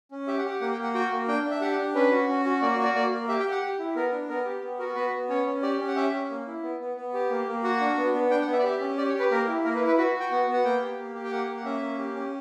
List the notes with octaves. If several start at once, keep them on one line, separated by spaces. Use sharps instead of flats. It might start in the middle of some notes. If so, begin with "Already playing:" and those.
C#4
G4 E5
F#5
G4
F#5
A#3 F#5
G5
A#3
F#5
F#4 G5
A#3
D4 G5
D4
E5
G4 F#5
F#5
D4
C#4 B4
F#4
C#4
F#4
A#3 D5
D5
F#4
D5
A#3 D5
A#3
G4 E5
G5
G4
F#5
G4
E4
B3 A#4
D4
B3 A#4
G4
B3
F#4 A#4
B3 B4
B3
C#4 C#5
C#4
G4 D5
C#4
F#5
C#4 E5
C#4
A#3
E4
B3
B3
B3
G4
A#3
A#3
F#4 F#5
D4
B3
B3
D4 G5
F#5
B3
E5
D5
G4 E5
C#4
G4 D5
C#5
G4
B4
A#3 A#4
E4
A#3 A#4
B4
E4
B4
F#4 B4
F#4
G5
B3 F#5
B3
F#5
A#3 G5
G4
A#3
G4
G5
A#3 F#5
A#3
F#5
C#4 E5
A#3
G4
C#4